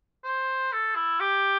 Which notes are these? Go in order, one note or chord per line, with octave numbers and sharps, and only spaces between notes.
C5
A4
E4
G4